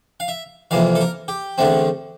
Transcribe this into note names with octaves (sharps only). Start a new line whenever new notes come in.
F5
E5
F2 C3 E3 A#3 F5
A4
A#4
G4
E2 D3 A3 C4